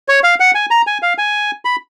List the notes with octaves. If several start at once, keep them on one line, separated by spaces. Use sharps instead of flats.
C#5
F5
F#5
G#5
A#5
G#5
F5
G#5
B5